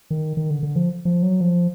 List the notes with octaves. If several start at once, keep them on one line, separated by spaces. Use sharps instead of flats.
D#3
D#3
D3
D3
F3
F3
F#3
F3